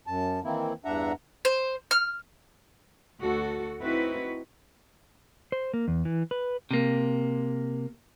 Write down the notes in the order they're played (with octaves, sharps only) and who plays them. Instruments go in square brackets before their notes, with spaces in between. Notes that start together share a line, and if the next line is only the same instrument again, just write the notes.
[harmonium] F#2 A5
D#3 E3 A#3 C4 E4
E2 G2 D4 E5 F#5 A#5
[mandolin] C5
F6
[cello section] D2 F#4 A4
C4 D#4 E4 F#4 B4
[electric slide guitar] C5
A#3
E2
E3
B4
[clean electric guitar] C3 A#3